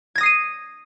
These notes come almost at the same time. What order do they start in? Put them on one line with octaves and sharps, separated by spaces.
G#6 A#6 D#6 C7 D#7